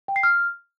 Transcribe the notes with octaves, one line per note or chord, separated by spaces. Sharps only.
G5
C7
F6